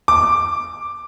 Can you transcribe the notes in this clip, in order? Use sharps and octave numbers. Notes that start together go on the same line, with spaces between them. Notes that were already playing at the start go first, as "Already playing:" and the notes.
D6